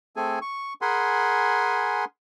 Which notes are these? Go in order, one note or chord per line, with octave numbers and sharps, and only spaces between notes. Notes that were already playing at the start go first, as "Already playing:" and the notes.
A3 C4 G#4 A4 G#5
C#6
G#4 A#4 F#5 G#5 B5 C6